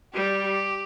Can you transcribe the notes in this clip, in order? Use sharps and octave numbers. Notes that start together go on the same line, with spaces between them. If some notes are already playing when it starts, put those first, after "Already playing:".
G3 G4